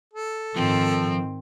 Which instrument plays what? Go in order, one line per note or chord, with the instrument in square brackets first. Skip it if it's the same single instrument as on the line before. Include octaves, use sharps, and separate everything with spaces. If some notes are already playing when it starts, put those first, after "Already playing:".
[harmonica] A4
[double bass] G#2 D#3 [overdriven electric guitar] F3 [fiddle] C4